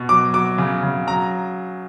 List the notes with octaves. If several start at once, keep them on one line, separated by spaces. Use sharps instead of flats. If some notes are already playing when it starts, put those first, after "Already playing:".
Already playing: B2
F#3 D6
F#3 D6
C#3
C#3
F#3 A#5